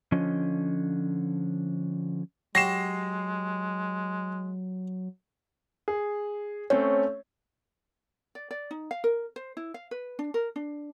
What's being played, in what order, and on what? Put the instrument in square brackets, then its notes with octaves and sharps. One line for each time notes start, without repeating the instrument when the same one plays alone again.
[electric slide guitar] D3 F3 C#4 D#5
[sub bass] F#3 [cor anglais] G#3 [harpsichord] F#4 G4 C#5 [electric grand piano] A#6 C7 E7
[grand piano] G#4
[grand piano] A3 C4 C#4 [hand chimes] C#5
[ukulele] D5
D5
D#4
F5
A#4
C5
E4
F5
B4
D4
A#4
D4